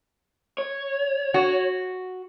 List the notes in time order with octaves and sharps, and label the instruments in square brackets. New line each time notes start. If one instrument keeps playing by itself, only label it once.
[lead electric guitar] C#5
[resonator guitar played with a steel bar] F#4